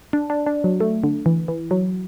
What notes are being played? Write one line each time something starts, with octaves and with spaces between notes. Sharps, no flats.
D4
D4
D4
F#3
A3
D3
E3
E3
F#3